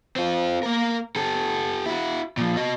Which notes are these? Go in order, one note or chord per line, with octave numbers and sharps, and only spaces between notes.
C4 F4
A#3 A#4
G4 A4
E4 F#4
A#2 F3
F#4 D#5